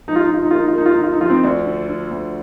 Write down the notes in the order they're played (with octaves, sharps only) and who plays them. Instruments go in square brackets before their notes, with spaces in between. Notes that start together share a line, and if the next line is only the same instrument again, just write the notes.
[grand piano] F3 [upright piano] D#4
[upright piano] F4
D#4
[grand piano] D3 [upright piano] F4
[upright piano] D#4
[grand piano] A#3 [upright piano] F4
[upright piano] D#4
F4
[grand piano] A#3 [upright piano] D#4
[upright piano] F4
D#4
[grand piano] D3
[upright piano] F4
D#4
[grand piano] F3 [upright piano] F4
[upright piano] C4 D#4
[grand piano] D2 [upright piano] D4
[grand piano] D3
D3
D2